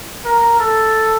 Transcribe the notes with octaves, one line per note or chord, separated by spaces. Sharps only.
A#4
A4